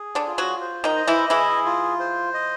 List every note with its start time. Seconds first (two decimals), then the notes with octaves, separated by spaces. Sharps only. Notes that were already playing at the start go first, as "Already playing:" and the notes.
Already playing: G#4
0.15 D3 D4
0.27 F4
0.38 F#3 F#4
0.61 C5
0.84 D#3 D#4
0.96 D#5
1.07 E3 E4
1.30 E3 E4 G#4
1.66 F4
2.00 C5
2.34 D#5